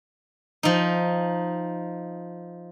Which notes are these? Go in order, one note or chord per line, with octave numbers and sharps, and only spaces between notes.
F3 D#4